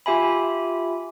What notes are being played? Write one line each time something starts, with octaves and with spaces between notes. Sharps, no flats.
F4 G4 E5 G#5 B5